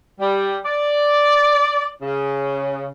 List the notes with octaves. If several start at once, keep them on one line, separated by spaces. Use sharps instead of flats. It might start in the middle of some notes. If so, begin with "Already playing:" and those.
G3
D5
C#3